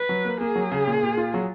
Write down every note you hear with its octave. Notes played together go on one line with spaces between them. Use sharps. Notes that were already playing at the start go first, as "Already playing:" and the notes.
Already playing: B4
F#3
A#3
A#3 G#4
F#3
C#3
A#2
A#2
F4
F#3